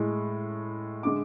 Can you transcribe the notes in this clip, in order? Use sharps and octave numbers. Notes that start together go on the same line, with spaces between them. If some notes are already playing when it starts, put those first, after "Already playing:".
Already playing: A2 G#3
D3 G#3 D6